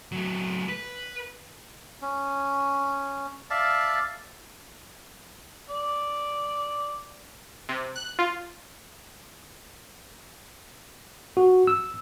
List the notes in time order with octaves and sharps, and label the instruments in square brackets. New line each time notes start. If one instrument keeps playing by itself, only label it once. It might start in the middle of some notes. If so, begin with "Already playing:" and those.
[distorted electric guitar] F#3 A3
B4
[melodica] C#4
D5 E5 F5 A5
[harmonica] D5
[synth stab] C3
F#6
F4
[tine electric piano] F#4
E6